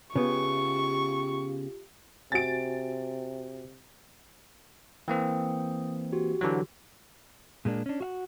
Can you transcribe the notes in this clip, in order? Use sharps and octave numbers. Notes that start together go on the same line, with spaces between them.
C#3 B3 F4 G4 C#6
C3 F#4 G#5 A6 D7
E3 A#3 C4 G5 D#6
F#4 G4
D3 E3 F#3
A#2 G#3 A#3 D4
C#4 D4
F#4 F5 F#5